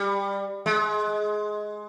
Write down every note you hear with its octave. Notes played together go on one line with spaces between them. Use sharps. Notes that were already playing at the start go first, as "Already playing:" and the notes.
Already playing: G3
G#3